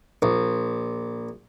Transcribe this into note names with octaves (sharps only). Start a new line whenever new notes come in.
A#1